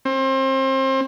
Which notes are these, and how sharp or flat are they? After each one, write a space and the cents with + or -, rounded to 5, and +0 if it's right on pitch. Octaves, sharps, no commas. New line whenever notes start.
C4 +30